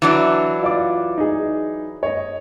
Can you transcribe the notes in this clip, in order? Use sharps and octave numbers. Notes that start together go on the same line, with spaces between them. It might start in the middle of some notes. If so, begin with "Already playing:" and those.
E3 F#3 D4
F4 D5 D6
D#4 G#4
C#5 D#5